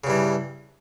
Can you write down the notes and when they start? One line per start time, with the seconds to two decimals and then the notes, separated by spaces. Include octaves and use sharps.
0.04 C#3
0.07 G2
0.10 E3